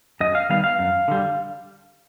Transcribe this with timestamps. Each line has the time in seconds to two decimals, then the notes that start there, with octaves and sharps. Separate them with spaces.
0.20 F#2 D#5
0.35 F5
0.49 D#3 G3 B3 F5
0.64 F5
0.79 F#2
1.08 D3 G3